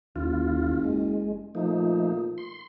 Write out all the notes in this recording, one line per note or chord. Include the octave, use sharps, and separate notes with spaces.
F#1 D#2 F4
G#3
A#2 F3 A3 D#4
C6